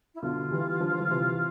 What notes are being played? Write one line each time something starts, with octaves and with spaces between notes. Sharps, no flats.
E4
B2 D3 F4
E3 G3
D3 F3
F3
C3 E3